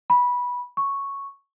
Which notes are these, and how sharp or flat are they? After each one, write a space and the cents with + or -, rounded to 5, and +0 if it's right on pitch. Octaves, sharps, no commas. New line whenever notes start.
B5 -15
C#6 -5